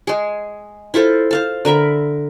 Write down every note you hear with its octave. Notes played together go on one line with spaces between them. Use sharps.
G#3 G#4
E4 F4 A4 C5
C5 F5 A5
D3 A#4 E5 B5